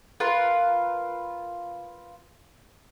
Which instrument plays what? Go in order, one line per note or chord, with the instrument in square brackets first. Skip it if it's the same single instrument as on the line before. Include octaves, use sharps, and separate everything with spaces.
[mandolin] F4 A#4 B4